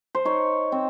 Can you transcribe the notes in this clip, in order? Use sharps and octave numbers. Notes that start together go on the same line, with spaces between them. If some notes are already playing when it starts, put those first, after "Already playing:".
C5
D#4 C#5
C4